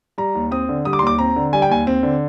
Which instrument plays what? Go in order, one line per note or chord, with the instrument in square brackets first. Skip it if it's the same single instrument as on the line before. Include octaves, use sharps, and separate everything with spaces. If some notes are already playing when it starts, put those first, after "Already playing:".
[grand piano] G3 A#5
D#2
C4 D#6
D3
G3 D#6
D6
D#2 C6
D6
C4 A#5
D3
G3 G#5
G5
D#2 G#5
C4
D3